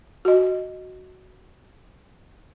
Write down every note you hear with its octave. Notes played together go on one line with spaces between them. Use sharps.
F#4 D#5